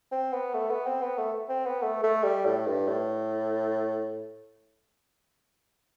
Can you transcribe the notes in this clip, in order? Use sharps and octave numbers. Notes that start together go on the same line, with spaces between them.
C4
B3
A3
B3
C4
B3
A3
C4
B3
A3
A3
G3
A2
G2
A2